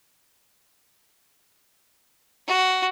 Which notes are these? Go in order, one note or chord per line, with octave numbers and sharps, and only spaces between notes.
F#4